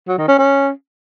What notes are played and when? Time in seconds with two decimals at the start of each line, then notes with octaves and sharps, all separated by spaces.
0.08 F#3
0.18 D#3
0.28 C#4
0.39 C#4